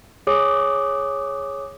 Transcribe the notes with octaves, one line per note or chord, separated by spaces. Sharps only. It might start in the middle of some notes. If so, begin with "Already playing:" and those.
G#4 C#5 D6 D#6